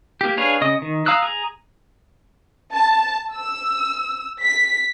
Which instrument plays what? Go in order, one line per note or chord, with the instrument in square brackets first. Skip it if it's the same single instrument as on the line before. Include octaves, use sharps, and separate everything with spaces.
[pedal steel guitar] A#3 G4
D4 G#4 B4 C#5 F5
C#3 D#5 D#6
D#3
F5 A#5 D#6 E6 F#6
G#4 A#5
[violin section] A5
E6
B6